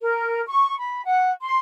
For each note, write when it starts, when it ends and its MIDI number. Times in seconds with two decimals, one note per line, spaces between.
0.01 0.42 70
0.46 0.77 85
0.77 1.01 83
1.04 1.30 78
1.42 1.59 84